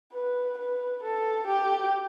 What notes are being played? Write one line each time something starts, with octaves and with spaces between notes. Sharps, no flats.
B4
B4
A4
G4